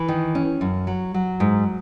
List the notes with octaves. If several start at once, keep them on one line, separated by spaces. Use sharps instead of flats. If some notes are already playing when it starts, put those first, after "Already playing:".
Already playing: E3
D#3
C#4
F#2
F#3
F#3
G#2